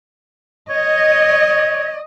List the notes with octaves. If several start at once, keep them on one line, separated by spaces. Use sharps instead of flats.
C#5 D#5